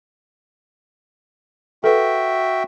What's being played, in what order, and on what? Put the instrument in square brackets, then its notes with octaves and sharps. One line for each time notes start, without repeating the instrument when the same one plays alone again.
[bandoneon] F#4 E5 G5 [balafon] A4 B4